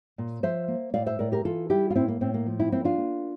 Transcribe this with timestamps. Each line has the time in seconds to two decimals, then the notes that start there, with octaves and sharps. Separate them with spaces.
0.18 A#2
0.43 F3 C5 E5
0.68 A#3
0.94 A2 D5 F5
1.06 C5 E5
1.19 A2 A#4 D5
1.32 G4 A#4
1.44 E3 F4 A4
1.70 G3 E4 G4
1.90 F4
1.95 A2 C4 E4
2.08 A#3
2.21 A2 C4
2.34 A#3
2.47 F3
2.60 C4 E4
2.72 A#3 C4 E4
2.85 D4 F4
2.98 A#3